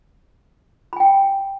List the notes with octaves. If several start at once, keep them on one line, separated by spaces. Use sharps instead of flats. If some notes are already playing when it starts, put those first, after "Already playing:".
G5 G#5 B5